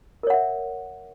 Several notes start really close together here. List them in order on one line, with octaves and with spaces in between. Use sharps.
A#4 C#5 F#5 E5